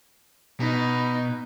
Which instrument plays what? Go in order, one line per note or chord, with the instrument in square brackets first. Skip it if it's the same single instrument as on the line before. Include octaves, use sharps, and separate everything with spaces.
[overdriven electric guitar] B2 [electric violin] D#4